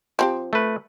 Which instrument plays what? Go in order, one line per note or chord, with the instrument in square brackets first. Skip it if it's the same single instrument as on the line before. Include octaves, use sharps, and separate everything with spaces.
[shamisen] F3 C4 G4
[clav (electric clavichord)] A3 B4